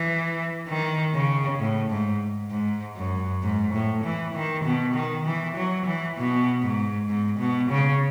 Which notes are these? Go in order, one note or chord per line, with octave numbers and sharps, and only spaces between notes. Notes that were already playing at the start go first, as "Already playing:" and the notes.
Already playing: E3
D#3
C#3
A2
G#2
G#2
F#2
G#2
A2
E3
D#3
B2
D#3
E3
F#3
E3
B2
G#2
G#2
B2
C#3